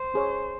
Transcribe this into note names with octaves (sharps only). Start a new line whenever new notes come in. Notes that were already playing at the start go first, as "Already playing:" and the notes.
Already playing: C5
C#4 G#4 C#5